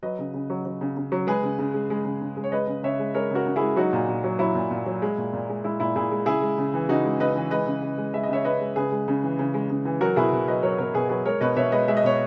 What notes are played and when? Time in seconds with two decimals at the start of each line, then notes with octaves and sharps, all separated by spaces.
0.03 F#3 B4 D#5
0.19 C#3
0.34 C#3
0.50 F#3
0.65 F#3
0.81 C#3
0.97 C#3
1.12 F#3
1.27 G#3 G#4 B4
1.43 C#3
1.59 C#3
1.74 G#3
1.90 G#3
2.05 C#3
2.21 C#3
2.37 G#3
2.44 C#5
2.52 G#3 B4 D#5
2.67 C#3
2.83 C#3 C#5 E5
2.99 G#3
3.14 G#3 A#4 C#5
3.31 C#3 F#4 A#4
3.46 C#3
3.56 E4 G#4
3.61 G#3
3.76 F#3 D#4 F#4
3.93 A#2
4.08 A#2
4.24 F#3
4.39 F#3 E4
4.55 A#2
4.71 A#2
4.86 F#3
5.02 G#3
5.18 A#2
5.33 A#2
5.49 G#3
5.64 G#3 E4
5.80 A#2 E4
5.96 A#2 E4 G#4
6.11 G#3
6.26 C#3 E4 G#4
6.42 G#3
6.58 C#3
6.74 E3
6.89 C#3 D#4 F#4
7.05 G#3
7.20 C#3 B4 D#5
7.36 E3
7.51 G#3 B4 D#5
7.66 C#3
7.82 C#3
7.98 G#3
8.14 G#3 E5
8.23 D#5
8.29 C#3 C#5 E5
8.45 C#3 B4 D#5
8.61 G#3
8.76 C#3 G#4 B4
8.92 G#3
9.08 C#3
9.23 E3
9.39 C#3
9.54 G#3
9.70 C#3
9.85 E3
10.01 F#3 F#4 A#4
10.16 B2 E4 G#4
10.33 B2
10.48 F#3 B4 D#5
10.63 F#3 A#4 C#5
10.78 B2 A#4 C#5
10.94 B2 G#4 B4
11.09 F#3 G#4 B4
11.25 G#3 A#4 C#5
11.41 B2 B4 D#5
11.56 B2 C#5 E5
11.72 G#3 B4 D#5
11.88 G#3 E5
11.97 D#5
12.04 B2 C#5